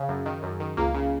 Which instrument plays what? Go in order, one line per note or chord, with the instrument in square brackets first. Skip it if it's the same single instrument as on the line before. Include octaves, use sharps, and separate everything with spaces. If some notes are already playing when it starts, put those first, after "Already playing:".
Already playing: [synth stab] C#3
F#2
D#3
F#2
D#3
C#2 A#3
C#3